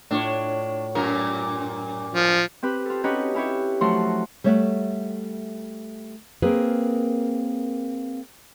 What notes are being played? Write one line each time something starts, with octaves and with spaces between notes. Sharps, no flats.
A2 D4 F4 C#5
F#2 A#2 A#4
F3
C4 G4 B4
F4 A4
C#4 D#4 F#4 G4 B4 C#5
C#4 E4 G4 C#5
F3 F#3 A3 F#4 F#5 C6
G3 A3 C#5 D#5 E5 F#5
A#3 C4 G#4 A#4 B4